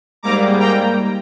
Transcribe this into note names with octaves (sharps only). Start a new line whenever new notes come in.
G#2 G3 A#3 A#5 D6
G5 A#5